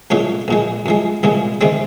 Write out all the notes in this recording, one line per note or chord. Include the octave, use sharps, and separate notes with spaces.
C2 A#2 F3 G#3 C#4
A#1 A#2 G#3
F#2 F3 G#3
C2 A#2 F3 G#3
C3 D#3 G#3 C4